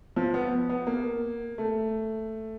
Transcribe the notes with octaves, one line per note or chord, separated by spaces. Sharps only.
F3
B3
B3
A#3
A3